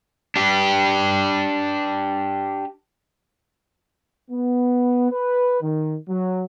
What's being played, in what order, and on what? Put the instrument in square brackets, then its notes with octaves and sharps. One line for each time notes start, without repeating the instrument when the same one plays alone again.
[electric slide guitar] D4 G4
[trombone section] B3
B4
D#3
F#3